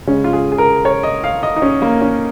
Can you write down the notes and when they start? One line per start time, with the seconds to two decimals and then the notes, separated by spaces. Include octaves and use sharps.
0.07 C#3 G#3 C#4
0.24 F4
0.33 G#4
0.52 G#4
0.58 A#4
0.85 C#5
1.03 D#5
1.24 F5
1.43 D#5
1.56 D#4
1.62 C#4
1.82 A#3
2.01 C#4